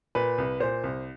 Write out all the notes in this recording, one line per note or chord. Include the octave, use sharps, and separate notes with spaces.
A#2 B4
C2
A#2 C5
C2